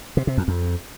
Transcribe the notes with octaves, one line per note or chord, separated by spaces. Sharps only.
C3
C3
F2
F2